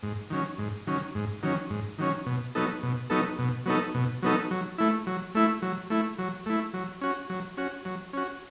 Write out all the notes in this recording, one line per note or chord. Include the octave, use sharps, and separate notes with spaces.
G#2
D#3 F#3 C#4
G#2
D#3 F#3 C#4
G#2
D#3 F#3 C#4
G#2
D#3 F#3 C#4
B2
F#3 B3 D#4 A4
B2
F#3 B3 D#4 A4
B2
F#3 B3 D#4 A4
B2
F#3 B3 D#4 A4
F#3
A3 E4
F#3
A3 E4
F#3
A3 E4
F#3
A3 E4
F#3
C#4 F#4
F#3
C#4 F#4
F#3
C#4 F#4